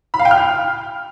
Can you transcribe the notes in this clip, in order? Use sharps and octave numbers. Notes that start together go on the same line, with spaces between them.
B5
F5
G5
F6